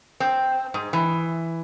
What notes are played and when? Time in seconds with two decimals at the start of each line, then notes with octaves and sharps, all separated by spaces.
0.20 C4
0.74 G#2
0.93 E3